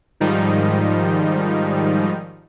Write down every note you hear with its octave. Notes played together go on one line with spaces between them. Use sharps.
G#2 D#3 F3 G3 D#4